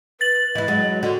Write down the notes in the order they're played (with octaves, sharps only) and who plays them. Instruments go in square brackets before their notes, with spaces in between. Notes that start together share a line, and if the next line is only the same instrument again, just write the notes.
[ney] B4 [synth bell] A6 F#7
[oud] E3 E4 [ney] D#5
[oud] F#3 G#3
[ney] D#5
[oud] D3 [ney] F#4